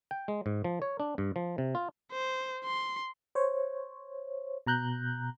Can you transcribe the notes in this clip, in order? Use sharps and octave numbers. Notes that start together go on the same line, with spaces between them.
G5
G#3
G#2
F3
C#5
D4
G2
F3
C3
F4
C5
C6
C5 C#5
B2 A#5 F#6 G6